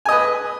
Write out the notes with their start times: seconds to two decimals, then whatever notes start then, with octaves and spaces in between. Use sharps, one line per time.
0.05 G#5
0.09 D#5
0.12 B4